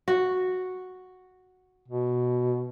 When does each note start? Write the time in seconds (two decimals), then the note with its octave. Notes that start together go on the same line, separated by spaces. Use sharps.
0.08 F#4
1.88 B2